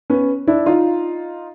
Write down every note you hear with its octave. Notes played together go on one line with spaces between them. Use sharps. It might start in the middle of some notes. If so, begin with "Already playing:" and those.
B3 C#4
D4 E4
D#4 F4